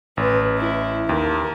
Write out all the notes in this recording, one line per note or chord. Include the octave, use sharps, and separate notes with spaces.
A1 B4
E4
D#2 A#4